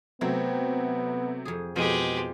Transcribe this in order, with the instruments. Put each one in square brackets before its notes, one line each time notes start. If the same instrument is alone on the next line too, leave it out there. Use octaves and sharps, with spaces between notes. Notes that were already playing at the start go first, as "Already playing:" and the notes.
[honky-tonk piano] C3 F#3 A3 [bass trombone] B3 [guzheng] C4
[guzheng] F2 G#4
[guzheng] F2 [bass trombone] B2 [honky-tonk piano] F3 [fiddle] G#3 G4